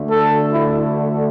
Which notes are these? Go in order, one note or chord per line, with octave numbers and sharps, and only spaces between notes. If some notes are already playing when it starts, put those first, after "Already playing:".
Already playing: D2 D3 A3
A4
E4